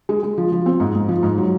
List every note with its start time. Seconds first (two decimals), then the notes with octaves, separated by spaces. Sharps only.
0.09 G#3
0.23 G#3
0.38 F3
0.52 F3
0.66 C4
0.80 G#2
0.95 G#2
1.09 F3
1.23 G#2
1.38 F#3